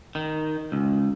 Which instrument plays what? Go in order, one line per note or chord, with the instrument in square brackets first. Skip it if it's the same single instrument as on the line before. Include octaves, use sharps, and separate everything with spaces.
[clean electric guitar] D#3
C#2